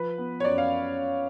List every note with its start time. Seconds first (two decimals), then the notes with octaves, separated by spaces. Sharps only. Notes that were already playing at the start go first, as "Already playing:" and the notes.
Already playing: F3 B4
0.18 B3
0.40 C#5
0.44 F#2 D5
0.58 F5